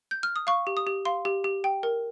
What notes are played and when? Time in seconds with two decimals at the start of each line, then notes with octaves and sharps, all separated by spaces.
0.11 G6
0.23 F6
0.36 D#6
0.47 F5 C#6
0.67 G4
0.77 D#6
0.87 G4
1.05 F5 C6
1.25 G4
1.44 G4
1.64 G5
1.83 A#4